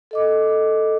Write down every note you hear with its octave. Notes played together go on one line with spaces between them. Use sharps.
A4 D#5 D6